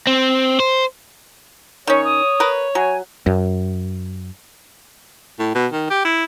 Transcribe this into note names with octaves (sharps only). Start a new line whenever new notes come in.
C4
C5
D#3 C#4 C#5 C#6
D#6
A#4 B4
F#3 G#5
F#2
A2
B2
D#3
G4
E4